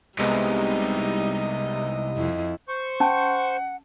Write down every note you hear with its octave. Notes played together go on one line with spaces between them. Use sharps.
C2 C3 G3 G#3 B3 D#4 D#5
F2 E4
C5 C#6
C#4 F#5 A5